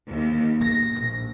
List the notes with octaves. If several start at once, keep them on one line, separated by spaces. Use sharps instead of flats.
D#2
A#6
A#1